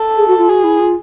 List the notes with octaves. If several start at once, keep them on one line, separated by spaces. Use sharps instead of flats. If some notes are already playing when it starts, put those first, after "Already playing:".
Already playing: A4
G#4
F#4
F4
F#4 G#4
E4
F4